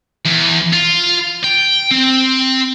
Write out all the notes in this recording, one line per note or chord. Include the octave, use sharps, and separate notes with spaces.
E2
F4
G5
C4